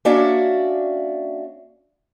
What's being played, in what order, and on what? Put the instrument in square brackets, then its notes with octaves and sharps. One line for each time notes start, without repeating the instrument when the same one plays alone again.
[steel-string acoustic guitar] A#3 C#4 D4 F#4 D5 E5